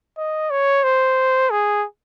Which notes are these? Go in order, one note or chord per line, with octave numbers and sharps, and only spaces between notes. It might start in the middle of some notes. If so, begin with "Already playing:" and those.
D#5
C#5
C5
G#4